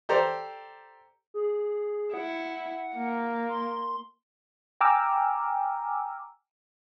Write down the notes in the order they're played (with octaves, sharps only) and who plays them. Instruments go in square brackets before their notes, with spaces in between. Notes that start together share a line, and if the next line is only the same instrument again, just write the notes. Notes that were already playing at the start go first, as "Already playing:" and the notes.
[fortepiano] G4 A4 C5 D5 A#5
[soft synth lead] G#4
[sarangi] E4 [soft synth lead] F#5
[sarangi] A#3
[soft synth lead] C6
[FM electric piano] G5 G#5 A#5 D6 E6 F6